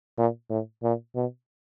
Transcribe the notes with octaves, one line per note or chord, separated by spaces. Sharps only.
A#2
A2
A#2
B2